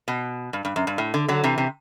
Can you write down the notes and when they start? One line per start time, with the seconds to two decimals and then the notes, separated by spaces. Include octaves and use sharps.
0.08 B2
0.53 G2
0.65 G2
0.76 F#2
0.87 G2
0.98 A2
1.14 D3
1.28 D3 F#3
1.44 C3 E3
1.58 C3